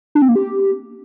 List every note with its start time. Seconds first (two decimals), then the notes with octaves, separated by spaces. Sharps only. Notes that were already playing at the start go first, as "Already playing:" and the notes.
0.15 D4
0.22 C4
0.29 A#3
0.35 G4